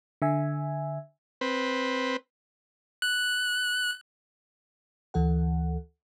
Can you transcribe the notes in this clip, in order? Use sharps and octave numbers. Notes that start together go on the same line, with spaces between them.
D3 E5 G#5
C4 B4
F#6
D2 E3 A4 F#5